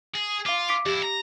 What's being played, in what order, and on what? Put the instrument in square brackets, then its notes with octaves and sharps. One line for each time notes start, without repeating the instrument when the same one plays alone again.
[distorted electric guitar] G#4
[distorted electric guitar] F4 [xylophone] F5 D6
[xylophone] D6 B6 D7
[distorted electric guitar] F2 E4 [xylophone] G4
[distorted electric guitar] A#5